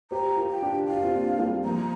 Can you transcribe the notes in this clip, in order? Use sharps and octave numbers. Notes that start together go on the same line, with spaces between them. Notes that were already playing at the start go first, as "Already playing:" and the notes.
G4 C5 A#5
F4 A#4
G5
D4 G4
F4 F5
G4
C4 F4
A#3 D4
G3 C4
F3 A#3 A#5